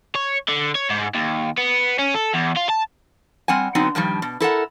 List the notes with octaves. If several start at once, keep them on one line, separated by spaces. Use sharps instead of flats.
C#5
D3
C#5
G#2
D#2
B3
C#4
A4
E2
F4
A5
G3 C4 F#5 G#5
D3 F#3 B3 C4 D#4
G2 D#3 F3 G3
B2
E4 A4 A#4 F#5